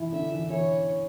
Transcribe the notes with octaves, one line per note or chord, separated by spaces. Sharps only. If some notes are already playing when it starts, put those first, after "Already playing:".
Already playing: E3 E4
D3 D4 E5
E3 E4
E3 E4 C#5